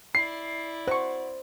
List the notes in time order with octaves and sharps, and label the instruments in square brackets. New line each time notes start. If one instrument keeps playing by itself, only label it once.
[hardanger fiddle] E4 D5 [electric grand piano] C7
[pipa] F#4 C#6 [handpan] C5